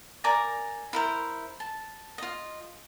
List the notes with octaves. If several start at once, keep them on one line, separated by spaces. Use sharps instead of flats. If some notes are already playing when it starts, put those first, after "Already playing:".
A#4 D5 G#5 A#5
E4 A#4 C5
A5
F4 D#5